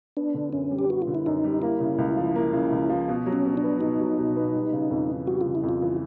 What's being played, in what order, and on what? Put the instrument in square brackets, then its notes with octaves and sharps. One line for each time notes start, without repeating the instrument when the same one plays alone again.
[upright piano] B3 [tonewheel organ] D4
[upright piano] D3
[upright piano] F#2 [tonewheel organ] C#4
[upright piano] G3
[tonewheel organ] G4
[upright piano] B3 [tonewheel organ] F#4
[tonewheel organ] F4
[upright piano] D3
[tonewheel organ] E4
[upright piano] F#2 [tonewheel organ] D#4
[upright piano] G3
[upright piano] A#3 [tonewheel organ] E4
[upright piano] C#3
C#2
F3
A#3
C#3
C#2
F3
B2
F#3
[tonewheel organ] C#4
[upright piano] B2
[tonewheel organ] D4
[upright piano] B3
[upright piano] B2 [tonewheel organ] D#4
[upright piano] F#3
B2
B3
G3
C#3
F2
E3
[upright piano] G3 [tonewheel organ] F#4
[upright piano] C#3 [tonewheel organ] F4
[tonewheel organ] E4
[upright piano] F2
[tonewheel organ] F4
[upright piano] E3